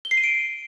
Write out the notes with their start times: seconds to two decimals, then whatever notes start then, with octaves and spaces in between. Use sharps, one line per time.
0.05 G7
0.11 C7
0.17 D#7
0.24 D7